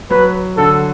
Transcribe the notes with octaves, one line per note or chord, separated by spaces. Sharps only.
F#3 B4
D3 A4